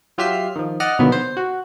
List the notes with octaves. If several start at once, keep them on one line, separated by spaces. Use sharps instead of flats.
F#3 F4 G4 E5 F6 C7
D#3 F3
D5 D#5 F#5 F6
B2 D3 D#3 F3 F#3 B3
C5
F#4